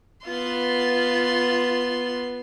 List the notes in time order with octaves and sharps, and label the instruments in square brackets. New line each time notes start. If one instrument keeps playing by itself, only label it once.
[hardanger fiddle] B3 C6 [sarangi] F4